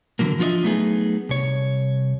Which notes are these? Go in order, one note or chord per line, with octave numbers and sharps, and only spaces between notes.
D3 E3 F#3 A#3
F3 D4 F4 F#4 D#5 E5
F#3 A3 B3 D#4 G#4
C2 C#5